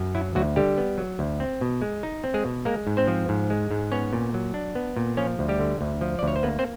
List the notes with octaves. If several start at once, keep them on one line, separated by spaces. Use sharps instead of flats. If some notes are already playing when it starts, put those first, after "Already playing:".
Already playing: F#2
F#3 E4
D2 F#3 F#4
D3 G3 G4
B3
F#3
D2
C4
B2
G#3
D#4
C4
G#3 G#4
B2
G#3 A#3 A#4
G#2
C4 C5
F3
G#2
G#3
G#2
B3 C#4 C#5
A#2
F#3
D4
B3
A#2
F3 C#4 C#5
D2
G3 G4
D3
D2
F3
D5
D2 C#5
C5
A#3 B3 B4
C4 C5